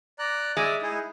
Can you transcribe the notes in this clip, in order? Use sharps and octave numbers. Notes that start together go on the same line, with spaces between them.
D5 A#5 F#6
G#3 D5 E5
D#4 E4 G#4